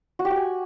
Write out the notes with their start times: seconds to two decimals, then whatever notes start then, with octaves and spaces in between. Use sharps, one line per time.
0.19 F#4
0.25 G4
0.30 F#4
0.36 G#5